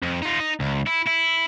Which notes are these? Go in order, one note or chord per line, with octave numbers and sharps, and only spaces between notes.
F2
D#4 F4
D#4
C#2
E4
E4